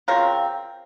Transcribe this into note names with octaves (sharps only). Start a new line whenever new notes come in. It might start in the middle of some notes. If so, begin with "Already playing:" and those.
C#3 F3 C4 A#4